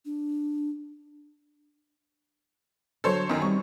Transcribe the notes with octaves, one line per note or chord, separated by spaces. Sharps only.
D4
D3 F#3 A4 C5 C#5
F#2 D#3
G3 C4 D#4 C#6